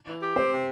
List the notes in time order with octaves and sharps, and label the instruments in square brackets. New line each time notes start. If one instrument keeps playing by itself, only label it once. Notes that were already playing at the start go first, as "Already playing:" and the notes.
[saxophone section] E3
G4
[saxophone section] C4 [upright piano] C5
[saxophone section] C3